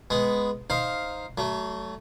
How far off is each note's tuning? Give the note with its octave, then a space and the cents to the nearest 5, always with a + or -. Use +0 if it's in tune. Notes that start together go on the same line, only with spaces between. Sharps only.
G#3 +0 B3 +0
D#4 +0 C5 +0 F5 +0
F#3 +35 A3 +0